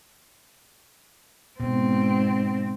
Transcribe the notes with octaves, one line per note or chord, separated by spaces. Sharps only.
G#2 B2 C4